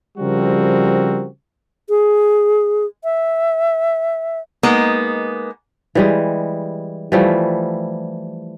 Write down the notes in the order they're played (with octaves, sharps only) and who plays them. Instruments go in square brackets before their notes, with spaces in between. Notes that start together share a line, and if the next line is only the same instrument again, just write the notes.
[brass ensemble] C#3 F3 G3 C4 F#4 A#4
[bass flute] G#4
E5
[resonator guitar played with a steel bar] G#3 A#3 B3 D#4
[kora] E3 G3 G#3
E3 F3 G3 A3